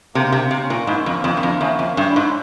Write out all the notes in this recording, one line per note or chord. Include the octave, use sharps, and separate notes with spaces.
C3 A#3
C3
A#3
C3
C#4
A#2
G#2 E4
F2
A#3
F2
G2 A#3
F2
E2 C#4
F2
C#4
G2
E4
G#2